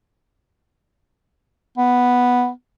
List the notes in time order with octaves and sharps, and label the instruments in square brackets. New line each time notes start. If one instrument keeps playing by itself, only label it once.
[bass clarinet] B3